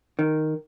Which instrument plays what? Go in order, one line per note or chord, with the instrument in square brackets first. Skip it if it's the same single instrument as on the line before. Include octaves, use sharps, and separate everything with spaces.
[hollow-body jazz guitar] D#3